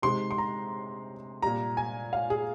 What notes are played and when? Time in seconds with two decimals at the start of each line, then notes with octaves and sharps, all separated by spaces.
0.02 C3 D#3 G#3 C6
0.31 C6
0.38 A#5
1.42 A#2 G3 A#5
1.77 G#5
2.13 F5
2.30 G#4